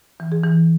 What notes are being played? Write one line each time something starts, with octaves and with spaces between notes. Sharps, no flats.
E3
G#4
E3